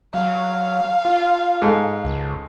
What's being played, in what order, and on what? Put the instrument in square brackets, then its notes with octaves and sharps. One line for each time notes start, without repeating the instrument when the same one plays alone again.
[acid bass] F#3 [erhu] F5
[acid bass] F4
[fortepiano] G#2 A4
[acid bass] C#2